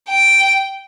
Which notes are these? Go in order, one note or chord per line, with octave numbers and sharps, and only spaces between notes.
G5